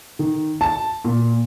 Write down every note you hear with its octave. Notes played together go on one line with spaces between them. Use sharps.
D#3
A5
A#2